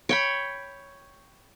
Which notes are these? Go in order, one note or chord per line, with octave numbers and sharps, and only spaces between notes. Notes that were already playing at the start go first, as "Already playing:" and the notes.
C#5 G5 B5